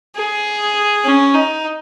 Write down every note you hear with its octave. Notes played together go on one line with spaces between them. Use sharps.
G#4
C#4
D#4